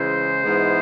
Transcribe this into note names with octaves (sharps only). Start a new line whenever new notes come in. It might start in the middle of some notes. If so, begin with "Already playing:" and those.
Already playing: C#3 E3 G#3 C5
G#2 E3 G#3 B3